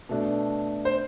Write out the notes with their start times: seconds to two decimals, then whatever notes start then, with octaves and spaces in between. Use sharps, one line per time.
0.09 B2 A3 D4
0.85 C5